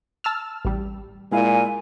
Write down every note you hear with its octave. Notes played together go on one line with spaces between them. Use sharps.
A5 E6 F6
A1 G3
A#2 G#3 E4 F5 G#5